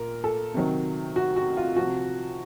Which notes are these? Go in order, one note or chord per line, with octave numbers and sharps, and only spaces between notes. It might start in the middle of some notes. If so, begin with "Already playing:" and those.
Already playing: A#2 A#4
A4
C3 D#3 F#3
F#4
F#4
F4
C3 F3 F#4